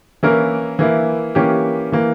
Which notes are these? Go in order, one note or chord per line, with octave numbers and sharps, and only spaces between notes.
E3 A#3 C#4 E4 A#4
E3 A#3 E4
E3 A#3 C#4 G4
E3 A#3